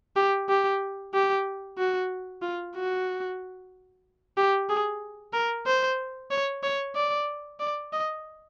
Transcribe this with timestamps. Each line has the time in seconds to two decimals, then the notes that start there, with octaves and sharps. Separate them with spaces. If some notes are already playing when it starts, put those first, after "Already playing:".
0.16 G4
0.49 G4
1.14 G4
1.78 F#4
2.42 F4
2.75 F#4
4.37 G4
4.69 G#4
5.33 A#4
5.67 C5
6.31 C#5
6.63 C#5
6.96 D5
7.60 D5
7.93 D#5